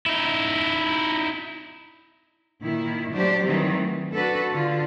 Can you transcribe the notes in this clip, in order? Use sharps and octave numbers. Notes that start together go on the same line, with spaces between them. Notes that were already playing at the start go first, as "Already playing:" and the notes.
D#4 E4
A#2 D#3 E4
F#3 A3 D4 G4 C5
D#3 E3 F#3 G3 C4
A3
D4 F#4 A4 B4
D3 F4